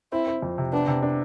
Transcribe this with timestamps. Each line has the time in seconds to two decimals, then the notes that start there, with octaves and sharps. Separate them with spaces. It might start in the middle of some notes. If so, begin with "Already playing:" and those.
0.12 C4 E4
0.27 C4
0.42 F2
0.58 C3
0.73 B3 D4
0.88 C3
1.02 D4